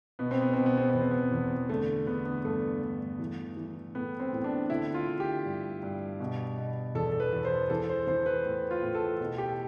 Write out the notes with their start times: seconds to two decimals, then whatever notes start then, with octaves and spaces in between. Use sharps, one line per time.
0.19 B2 B3
0.31 C4
0.42 B3
0.53 B2 C4
0.66 B3
0.77 C4
0.89 E2 B3
1.01 C4
1.11 B3
1.31 E2
1.69 D3 A3
2.07 D3 B3
2.25 B3
2.44 G2 A3
2.82 G2
3.19 E3
3.57 E3
3.95 A2 B3
4.20 C4
4.33 A2
4.44 D4
4.70 D3 E4
4.94 F4
5.08 D3
5.20 G4
5.45 G2
5.83 G2
6.20 B2
6.58 B2
6.95 E2 A4
7.12 A4
7.20 B4
7.33 E2
7.45 C5
7.70 E3 A4
7.89 C5
8.07 E3 C5
8.26 B4
8.45 A2
8.71 F4
8.83 A2
8.95 A4
9.20 B2 A4
9.38 G4